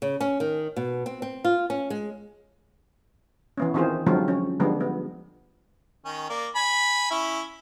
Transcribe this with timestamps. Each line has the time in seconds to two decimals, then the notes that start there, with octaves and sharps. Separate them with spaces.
0.02 C#3
0.21 C#4
0.40 D#3
0.76 B2
1.06 C4
1.22 C4
1.45 F4
1.70 C#4
1.90 G#3
3.57 E3 B3 C#4
3.74 D#3 E3 C4 F4 G#4 C5
4.07 D3 F3 F#3 G#3 C4 F4
4.28 C#4
4.60 D3 F3 G3 G#3 B3
4.81 B3
6.05 D#3 C#4
6.30 A#3 D5
6.55 G#5 B5
7.11 C#4 E4